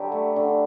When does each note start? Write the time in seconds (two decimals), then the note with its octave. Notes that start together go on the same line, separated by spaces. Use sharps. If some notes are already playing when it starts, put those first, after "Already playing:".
Already playing: D3 F#3 G4 A4 B4
0.12 A3
0.36 D3